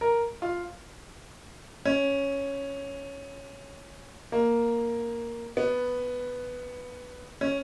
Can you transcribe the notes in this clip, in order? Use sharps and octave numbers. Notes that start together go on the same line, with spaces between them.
A#4
F4
C#4
A#3
B3
C#4